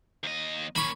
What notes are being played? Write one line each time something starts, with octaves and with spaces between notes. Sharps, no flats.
D#2 D#5
A#3 C#4 B5 C#6